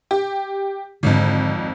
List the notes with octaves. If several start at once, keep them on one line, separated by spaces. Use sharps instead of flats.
G4
G#1 F2 G#2 D3